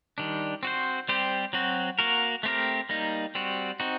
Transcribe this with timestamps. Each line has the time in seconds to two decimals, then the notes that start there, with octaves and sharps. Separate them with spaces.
0.18 D#3 G3 D4
0.63 C4 F#4 C5
1.09 G3 C4 G4 C5
1.53 F#3 C4 F#4
1.99 A#3 F#4 A#4
2.43 A3 C4 G4 A#4
2.89 G3 A#3 D#4
3.35 G3 C4 F#4
3.80 C4 D#4 F#4